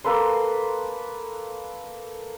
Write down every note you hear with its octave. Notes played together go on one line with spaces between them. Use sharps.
A#3 A4 B4 C6